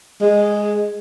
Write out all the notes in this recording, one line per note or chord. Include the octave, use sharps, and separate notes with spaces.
G#3